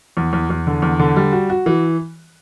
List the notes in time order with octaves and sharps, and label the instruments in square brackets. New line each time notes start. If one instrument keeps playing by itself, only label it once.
[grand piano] E2
E2
E2
D3
E2
D3
G3
F#4
F#4
E3